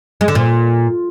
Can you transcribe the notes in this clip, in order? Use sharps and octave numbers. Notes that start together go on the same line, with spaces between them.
G#3
D3
A#2